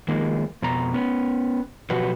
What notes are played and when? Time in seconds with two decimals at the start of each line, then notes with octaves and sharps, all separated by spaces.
0.08 D#3 F3 G#3 A#3
0.62 F2 B2 A#5
0.94 B3 C#4
1.90 B2 F3 F#3 F#4 G4 B4